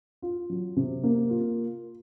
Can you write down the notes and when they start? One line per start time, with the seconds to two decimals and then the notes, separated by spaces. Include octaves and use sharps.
0.22 F4
0.50 F#3
0.77 C3
1.03 A#3
1.30 F4